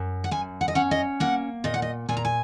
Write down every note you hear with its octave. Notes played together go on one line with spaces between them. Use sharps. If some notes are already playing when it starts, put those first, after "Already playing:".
Already playing: F#2
F#5
F#2 G#5
F#5
D#5
C#4 F#5
D#5
A#3 F#5
A#2 D#5
F#5
D#5
A#2 G#5
A#5
G#5